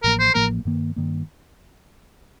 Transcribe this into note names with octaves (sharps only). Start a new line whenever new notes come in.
A1 A2 F3 A#3 A#4
C5
A1 A2 F3 A#3 A#4
G2 D#3 A#3
G2 D#3 A#3